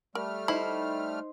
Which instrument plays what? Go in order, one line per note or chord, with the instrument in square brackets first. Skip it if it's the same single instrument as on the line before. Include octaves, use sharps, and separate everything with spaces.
[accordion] G3 A3 F6 [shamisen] A#4
[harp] D#4 C5 [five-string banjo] E4 [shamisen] B5